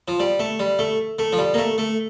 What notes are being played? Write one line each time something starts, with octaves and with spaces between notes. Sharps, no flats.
F3
G3
A3
G3
A3
A3
F3
G3
A#3
A3
A3